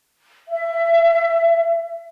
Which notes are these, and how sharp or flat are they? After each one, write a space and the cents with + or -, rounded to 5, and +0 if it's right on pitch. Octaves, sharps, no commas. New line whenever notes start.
E5 +25